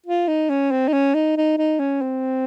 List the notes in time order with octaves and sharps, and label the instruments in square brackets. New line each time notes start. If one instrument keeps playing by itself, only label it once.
[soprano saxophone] F4
D#4
C#4
C4
D#4
C#4
D#4
D#4
D#4
C#4
C4